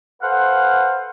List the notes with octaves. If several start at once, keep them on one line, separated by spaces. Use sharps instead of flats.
A4 B4 C5 F5 F#5